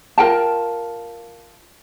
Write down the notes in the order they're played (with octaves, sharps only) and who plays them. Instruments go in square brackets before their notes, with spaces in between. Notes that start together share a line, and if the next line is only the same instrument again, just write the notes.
[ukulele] F4 A#4 G5 A5